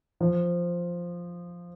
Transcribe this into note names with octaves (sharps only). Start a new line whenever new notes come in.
F3